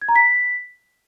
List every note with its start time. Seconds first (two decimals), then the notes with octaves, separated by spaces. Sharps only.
0.02 G#6
0.09 A#5
0.16 B6